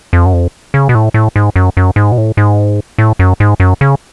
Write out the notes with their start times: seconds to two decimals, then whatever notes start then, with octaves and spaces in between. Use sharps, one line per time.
0.13 F2
0.26 F#2
0.33 F2
0.74 C#3
0.89 B2
0.95 A2
1.14 A2
1.36 G#2
1.56 F#2
1.77 F#2
1.96 G#2
2.12 B2
2.18 A2
2.37 G#2
2.98 A2
3.19 F#2
3.40 G#2
3.60 F#2
3.81 C#3